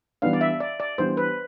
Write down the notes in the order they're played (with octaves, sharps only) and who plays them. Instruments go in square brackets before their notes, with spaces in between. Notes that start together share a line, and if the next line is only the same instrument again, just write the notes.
[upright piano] E3 G3 B3 D4 [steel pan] F5
[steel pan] D5
E5
D5
D5
[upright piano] E3 G3 B3 D4 [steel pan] C5
[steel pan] B4